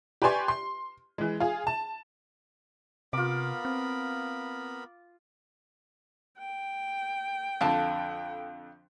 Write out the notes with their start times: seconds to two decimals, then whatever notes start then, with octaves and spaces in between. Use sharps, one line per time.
0.22 G4 B4 D5 G#5 C6 C#6
0.48 C6
1.18 E3 G#3
1.40 F4 G#4
1.67 A5
3.13 C3 B3 F4 A#4 B5 D6
3.65 C4
6.38 G5
7.61 F2 D3 F5 A5